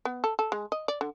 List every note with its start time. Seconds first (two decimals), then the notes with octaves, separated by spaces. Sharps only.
0.05 B3
0.24 A4
0.39 A4
0.52 G#3
0.72 D#5
0.88 D5
1.01 D3